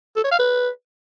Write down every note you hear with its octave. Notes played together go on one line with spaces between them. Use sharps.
A4
C#5
F5
B4